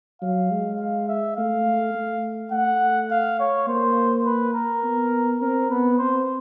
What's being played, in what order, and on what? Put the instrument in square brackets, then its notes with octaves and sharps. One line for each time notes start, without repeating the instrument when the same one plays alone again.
[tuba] F#3 [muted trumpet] F5
[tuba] G#3
[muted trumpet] F5
E5
[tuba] A3 [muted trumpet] F5
[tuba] A3
[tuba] A3 [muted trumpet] F#5
[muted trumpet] F5
C#5
[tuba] A#3 [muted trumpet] C5
[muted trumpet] B4
A#4
[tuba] B3
[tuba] C4 [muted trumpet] A#4
[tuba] B3 [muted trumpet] B4
[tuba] C4 [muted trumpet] C5